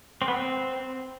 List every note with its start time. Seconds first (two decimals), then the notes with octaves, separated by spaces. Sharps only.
0.22 C4
0.28 B3
0.34 C4